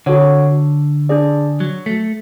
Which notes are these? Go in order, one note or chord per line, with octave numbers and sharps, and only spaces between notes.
D3 F#4 A4 C#5 F#5
D4 G#4 D5
F#3
A3